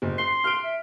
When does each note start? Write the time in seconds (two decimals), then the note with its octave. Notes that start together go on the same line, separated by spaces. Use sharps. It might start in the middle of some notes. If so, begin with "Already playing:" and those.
0.02 F#1
0.18 C6 C7
0.44 F6 D7
0.63 E5